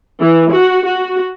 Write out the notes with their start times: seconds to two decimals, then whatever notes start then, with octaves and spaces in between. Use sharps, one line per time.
0.21 E3
0.52 F#4
0.86 F#4